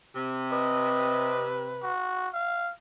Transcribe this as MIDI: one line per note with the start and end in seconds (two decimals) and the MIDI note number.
0.16 1.95 48
0.52 1.91 71
0.52 1.47 75
1.83 2.28 66
2.34 2.72 77